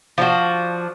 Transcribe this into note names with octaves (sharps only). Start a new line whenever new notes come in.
F3 D4 F#4